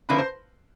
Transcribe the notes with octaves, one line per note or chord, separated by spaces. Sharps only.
D3 F3 A#3 C#4 E4 B4 B5
C5 C6